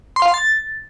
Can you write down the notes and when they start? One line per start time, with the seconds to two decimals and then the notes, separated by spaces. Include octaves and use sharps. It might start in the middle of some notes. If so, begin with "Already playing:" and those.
0.16 C6
0.22 F5
0.28 C6
0.34 A6